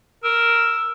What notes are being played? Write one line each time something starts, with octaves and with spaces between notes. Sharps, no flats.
A#4 E6